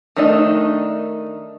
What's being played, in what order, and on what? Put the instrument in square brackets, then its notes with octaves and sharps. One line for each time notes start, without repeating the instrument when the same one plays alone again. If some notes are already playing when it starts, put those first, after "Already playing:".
[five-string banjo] D#3 A3 D4 D#4